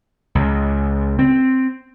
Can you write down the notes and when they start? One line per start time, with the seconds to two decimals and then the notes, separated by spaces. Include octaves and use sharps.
0.35 C#2
1.19 C4